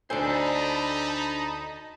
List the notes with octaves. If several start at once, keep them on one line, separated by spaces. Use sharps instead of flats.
D2 D4 D#4 A4 C5 G#5 A5 B5